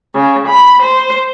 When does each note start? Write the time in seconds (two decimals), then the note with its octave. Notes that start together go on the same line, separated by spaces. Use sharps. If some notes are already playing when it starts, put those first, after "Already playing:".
0.14 C#3
0.47 B5
0.82 C5